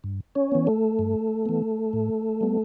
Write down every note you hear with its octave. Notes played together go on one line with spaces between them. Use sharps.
G2
C#4 C#5
E3 B3
A3 A4
G2
E3 B3
A2
G3 B3